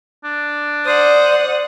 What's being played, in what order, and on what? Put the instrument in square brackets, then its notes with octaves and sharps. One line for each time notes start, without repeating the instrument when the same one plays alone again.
[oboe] D4
[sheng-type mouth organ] C5 [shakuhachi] D5 [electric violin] F#5 D#6